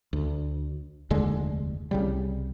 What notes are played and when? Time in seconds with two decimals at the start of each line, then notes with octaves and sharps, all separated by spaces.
0.13 D2
1.10 F1 D#2 D3 G#3
1.91 C2 C#3 G3